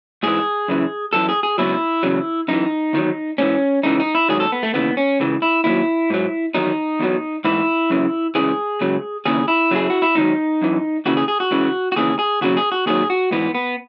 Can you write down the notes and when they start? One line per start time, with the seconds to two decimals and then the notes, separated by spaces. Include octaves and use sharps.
0.23 G#2 E3 G#4
0.68 F#2 C#3 E3
1.13 F#2 E3 A4
1.29 G#4
1.43 G#4
1.58 C#2 B2 F#3 E4
2.03 E2 C#3 F#3
2.48 F#2 E3 D#4
2.93 E2 D#3 F#3
3.38 G#2 E3 C#4
3.83 C#2 C#3 E3 D#4
4.00 D#4
4.15 E4
4.29 G#2 D#3 F#3 G#4
4.40 A4
4.52 B3
4.63 A3
4.74 D#2 C#3 E3 B3
4.97 C#4
5.20 C#2 C#3 E3
5.42 E4
5.64 D#2 D#3 F#3 E4
6.10 G#2 F#3
6.54 E2 D#3 F#3 D#4
7.00 E2 B2 F#3
7.44 G#2 E3 E4
7.90 F#2 C#3 E3
8.35 C#2 C#3 E3 G#4
8.81 C#2 C#3 F#3
9.26 D#2 C#3 E3 G#4
9.48 E4
9.71 F#2 C#3 F#3 G#4
9.90 F#4
10.02 E4
10.15 G#2 D#3 F#3 D#4
10.62 F#2 E3
11.06 D#2 C#3 E3 F#4
11.17 G#4
11.28 G#4
11.40 F#4
11.51 C#2 C#3 E3
11.92 F#4
11.96 D#2 C#3 E3 G#4
12.19 G#4
12.41 D#2 C#3 F#3 F#4
12.57 G#4
12.72 F#4
12.86 D#2 D#3 F#3 G#4
13.10 F#4
13.31 G#2 E3 B3
13.55 B3